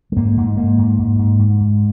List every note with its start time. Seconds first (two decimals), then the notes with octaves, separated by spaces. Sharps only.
0.12 G#3
0.16 G#2 A#3
0.37 G#2
0.57 G#2 A#3
0.78 G#2
0.98 G#2
1.19 G#2
1.39 G#2
1.61 G#2